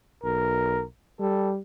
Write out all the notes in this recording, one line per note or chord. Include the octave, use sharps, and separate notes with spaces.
B1 A#4
G3 A4